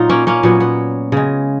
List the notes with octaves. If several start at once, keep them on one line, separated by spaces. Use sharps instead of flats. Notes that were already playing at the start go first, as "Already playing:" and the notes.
Already playing: A#2 F#3 D#4 F4
A#3 C#4
A#3 C#4
A#2 F#3 B3
B3
C#3 G#3